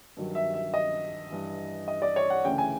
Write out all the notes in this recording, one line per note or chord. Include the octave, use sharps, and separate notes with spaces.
G2 D#3 F#3
E5
E5
D#5
G2 E3
D#5
D5
C#5
F#5
D2 C#3 E3 G5
G#5